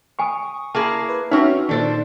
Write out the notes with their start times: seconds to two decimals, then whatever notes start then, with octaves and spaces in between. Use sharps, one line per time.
0.19 G#5 B5 C#6 D#6
0.75 A#3 E4 G#4 A5 B5
1.09 B4
1.31 C4 C#4 D#4 F#4 B4 C#5 E5
1.69 A#2 D#3 D4 A4 C5